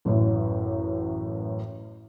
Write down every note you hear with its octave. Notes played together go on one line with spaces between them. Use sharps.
A1 F#2 A2